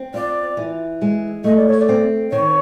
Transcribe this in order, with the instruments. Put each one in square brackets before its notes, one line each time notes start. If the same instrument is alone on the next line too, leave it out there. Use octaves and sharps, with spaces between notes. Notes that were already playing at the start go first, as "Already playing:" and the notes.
Already playing: [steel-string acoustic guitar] C4
[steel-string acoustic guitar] F4 [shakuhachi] D5
[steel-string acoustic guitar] E3
G#3
[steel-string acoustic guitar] A3 [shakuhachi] D#5
[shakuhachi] D5
C#5
D5
[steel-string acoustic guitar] C4
[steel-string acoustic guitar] D#3 [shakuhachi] C#5